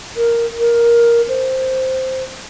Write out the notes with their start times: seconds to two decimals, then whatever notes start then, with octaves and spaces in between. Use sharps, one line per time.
0.17 A#4
0.60 A#4
1.28 C5